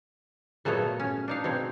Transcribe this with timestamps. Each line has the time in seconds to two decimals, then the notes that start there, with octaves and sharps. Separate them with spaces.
0.65 A#2 F#3 A3 B3 C#5 D#5
1.00 C#4
1.28 D4 D#4 F5
1.44 B2 C4 C#5